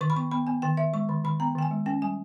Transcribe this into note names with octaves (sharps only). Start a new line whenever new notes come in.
D#3 C#6
B5
B3 C#6
B3 B5
B3 G#5
D#3 G5
D#3 E5
G#3 C#6
D#3 B5
D#3 B5
B3 A#5
D#3 G5
G#5
G#3
C#4 G5
G3 G#5